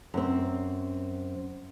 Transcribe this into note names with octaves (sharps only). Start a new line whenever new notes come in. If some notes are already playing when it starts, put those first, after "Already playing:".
F#2 C4